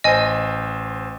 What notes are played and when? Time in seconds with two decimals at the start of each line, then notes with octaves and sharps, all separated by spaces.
0.04 A1 C5 D#5 G#5